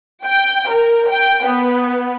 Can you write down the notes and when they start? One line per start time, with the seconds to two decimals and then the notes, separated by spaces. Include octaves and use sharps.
0.25 G5
0.70 A#4
1.10 G5
1.46 B3